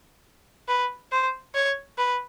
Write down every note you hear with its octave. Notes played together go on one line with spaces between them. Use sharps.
B4
C5
C#5
B4